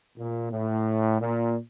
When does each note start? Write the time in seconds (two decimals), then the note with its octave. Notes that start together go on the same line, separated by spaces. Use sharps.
0.18 A#2
0.52 A2
1.21 A#2